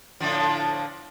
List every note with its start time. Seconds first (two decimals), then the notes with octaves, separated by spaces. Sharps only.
0.20 A2 D3 F3